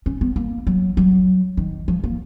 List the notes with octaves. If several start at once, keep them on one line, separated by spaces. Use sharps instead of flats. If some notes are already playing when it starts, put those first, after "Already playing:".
C#4
B3
A#3
F#3
F#3
D#3
F3
A#3